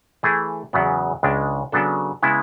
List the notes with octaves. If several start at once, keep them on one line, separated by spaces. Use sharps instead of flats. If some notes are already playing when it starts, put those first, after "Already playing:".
E3 A3 E4 G#4
E2 C#3 F#3 B3
C#2 C#3 G#3 D4
C#3 F#3 B3 D4 A4
C#3 G#3 B3 E4